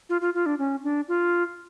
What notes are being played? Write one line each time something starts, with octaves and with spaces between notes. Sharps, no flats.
F4
F4
F4
D4
C#4
D4
F4